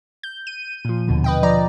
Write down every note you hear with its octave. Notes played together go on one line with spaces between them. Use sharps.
G6
D#7
A#2 F3
D#2 B2 D3
B4 D#5 G5
F3 D5 A#5